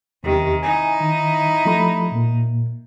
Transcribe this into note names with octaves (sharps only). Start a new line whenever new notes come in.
E2 C3 D#3 G4
D#4 E4 G#5
D#3
F3 A3 B5
A#2 A#3